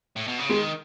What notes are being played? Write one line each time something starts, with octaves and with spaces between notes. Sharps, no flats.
A2
B2
C#3
D#3 G#3